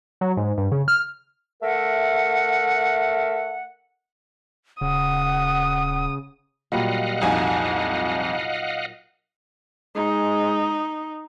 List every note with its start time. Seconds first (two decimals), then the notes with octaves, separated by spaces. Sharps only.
0.21 F#3
0.37 G#2
0.58 G2
0.72 C#3
0.88 F6
1.62 A3 A#4 E5 F#5
4.81 D#1 C#3 F#5 D#6
6.72 A#2 F#3 G3 D#5 F5 F#5
7.21 C2 F2 F#3 A#3 D#4 G#5
9.95 G#3 D#4